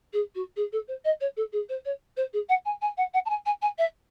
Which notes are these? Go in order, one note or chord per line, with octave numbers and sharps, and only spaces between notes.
G#4
F#4
G#4
A4
C5
D#5
C#5
A4
G#4
C5
C#5
C5
G#4
F#5
G#5
G#5
F#5
F#5
A5
G#5
G#5
G#5
E5